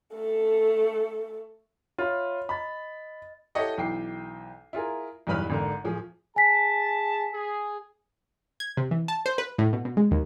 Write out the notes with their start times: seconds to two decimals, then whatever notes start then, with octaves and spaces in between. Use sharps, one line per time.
0.14 A3 A4
1.98 F4 C#5 E5 B5
2.49 D#5 B5 A6
3.55 E4 G4 A4 C#5 D#5 F#5
3.78 B1 E3 G5 D6 C7
4.73 E4 F4 G#4 A#4
5.27 B1 E2 G2 B4 B5 F6
5.50 G#1 D3 A#3
5.84 D1 F3 G#4
6.36 G#4 G#5 A5 B6
7.34 G#4
8.60 G#6
8.77 C3
8.91 E3
9.08 A5
9.26 C5
9.38 B4
9.58 A2
9.73 B2
9.85 B2
9.97 G#3
10.11 D#2